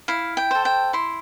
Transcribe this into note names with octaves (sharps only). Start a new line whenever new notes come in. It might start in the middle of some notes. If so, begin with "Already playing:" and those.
E4 F5
G5
A4 C5
G5
E4 C6